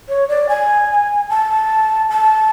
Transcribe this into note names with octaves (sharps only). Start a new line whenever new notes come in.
C#5
D5
G#5
A5
A5